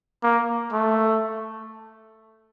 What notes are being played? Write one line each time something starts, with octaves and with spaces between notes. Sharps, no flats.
A#3
A3